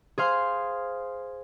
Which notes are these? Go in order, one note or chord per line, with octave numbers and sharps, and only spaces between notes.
G#4 C5 F5 C6